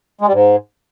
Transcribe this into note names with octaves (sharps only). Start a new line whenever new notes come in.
G#3
G3
G#2